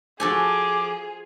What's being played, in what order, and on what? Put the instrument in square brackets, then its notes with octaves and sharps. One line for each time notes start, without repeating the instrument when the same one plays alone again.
[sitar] F3 [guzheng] F#4 A4 G#5 [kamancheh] G#4 [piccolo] D6